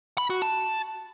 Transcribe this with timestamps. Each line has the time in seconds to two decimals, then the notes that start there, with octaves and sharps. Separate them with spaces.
0.18 B5
0.30 F#4
0.42 A5